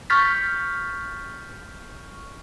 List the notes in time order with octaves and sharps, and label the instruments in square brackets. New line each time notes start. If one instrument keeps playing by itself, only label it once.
[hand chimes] C#6 F6 G6 A6 B6